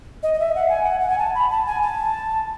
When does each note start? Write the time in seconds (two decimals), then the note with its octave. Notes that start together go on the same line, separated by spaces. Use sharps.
0.23 D#5
0.34 D#5
0.40 E5
0.55 F#5
0.69 G#5
0.83 F#5
1.00 F#5
1.09 G#5
1.19 A5
1.35 B5
1.51 A5
1.67 G#5
1.82 A5